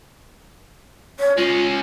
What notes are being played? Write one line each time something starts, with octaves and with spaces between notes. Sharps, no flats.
C#5
G#3 C#4 F4